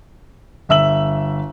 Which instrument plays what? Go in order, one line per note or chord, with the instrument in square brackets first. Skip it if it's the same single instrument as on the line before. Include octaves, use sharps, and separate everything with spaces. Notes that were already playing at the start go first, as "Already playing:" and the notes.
[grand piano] G1 E5 E6 F#7